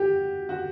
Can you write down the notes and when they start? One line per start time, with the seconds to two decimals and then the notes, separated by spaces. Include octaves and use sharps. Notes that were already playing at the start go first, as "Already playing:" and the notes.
Already playing: F#4 G4
0.49 F#4